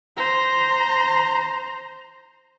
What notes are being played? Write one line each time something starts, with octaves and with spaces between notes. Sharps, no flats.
C5 A#5